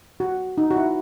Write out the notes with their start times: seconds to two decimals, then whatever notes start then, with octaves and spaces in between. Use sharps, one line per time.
0.20 F#4
0.58 D#4
0.71 F#4
0.76 E4